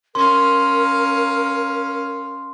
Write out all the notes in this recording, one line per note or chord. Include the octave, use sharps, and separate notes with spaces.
C#4 A#4 F5 C6